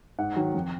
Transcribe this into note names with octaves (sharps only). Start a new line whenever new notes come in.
G#2 F#5
D#3 F#3
F2